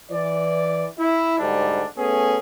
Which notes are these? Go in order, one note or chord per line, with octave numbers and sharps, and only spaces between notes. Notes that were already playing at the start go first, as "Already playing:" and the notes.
E3 D5
E4
D2 G#2 G3 D4
A3 B3 C#4 G#4